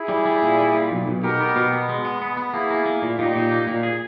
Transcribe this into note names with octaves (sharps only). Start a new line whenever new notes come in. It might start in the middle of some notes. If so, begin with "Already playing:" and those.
Already playing: E4 G#4
G3
G3
A#2
G3
A#2
B1
B1
B2 G4 A#4
B3
B2
B3
G#3
B3
B3
B3
A#3 E4 G#4
A#3
A#3
A#2
A#2 D#4 G4
A#2
A#3
A#2
G#4